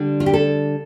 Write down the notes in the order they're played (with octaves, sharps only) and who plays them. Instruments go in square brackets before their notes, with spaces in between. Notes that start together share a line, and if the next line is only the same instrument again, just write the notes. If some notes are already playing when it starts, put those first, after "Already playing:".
Already playing: [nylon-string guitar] D3 G3 D4
F4
G4
A4